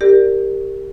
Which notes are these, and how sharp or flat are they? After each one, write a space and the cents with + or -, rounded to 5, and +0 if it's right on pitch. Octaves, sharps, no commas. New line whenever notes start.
G4 +5 A#4 -15 D5 +0